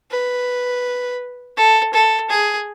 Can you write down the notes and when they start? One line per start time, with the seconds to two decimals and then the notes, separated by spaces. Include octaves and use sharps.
0.11 B4
1.57 A4
1.94 A4
2.30 G#4